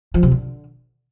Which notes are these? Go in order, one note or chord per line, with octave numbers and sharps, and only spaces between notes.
F3
C3
D3